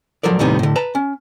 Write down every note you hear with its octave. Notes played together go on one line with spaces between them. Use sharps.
F3 F#3 A4 A#4 D5
D#2 A2 C3 G3 B3 D#4
A2 D3
B4 A5 A#5
C#4